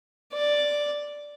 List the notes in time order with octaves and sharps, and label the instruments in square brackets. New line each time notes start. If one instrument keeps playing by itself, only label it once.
[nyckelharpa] D5